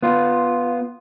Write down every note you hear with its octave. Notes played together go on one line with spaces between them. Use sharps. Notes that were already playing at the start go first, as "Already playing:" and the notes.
B3 F4